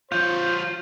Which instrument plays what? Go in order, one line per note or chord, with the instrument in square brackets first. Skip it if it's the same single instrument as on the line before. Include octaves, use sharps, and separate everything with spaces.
[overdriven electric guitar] F3 C#5 [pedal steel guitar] F4 [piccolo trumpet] C5 [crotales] G6